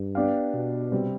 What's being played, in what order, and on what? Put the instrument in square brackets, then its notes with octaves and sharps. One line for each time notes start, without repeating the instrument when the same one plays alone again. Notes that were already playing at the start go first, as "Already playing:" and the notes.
Already playing: [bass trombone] G2
[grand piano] B3 D4 G4 D5 F5
[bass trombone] B2
[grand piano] C3 G3 C4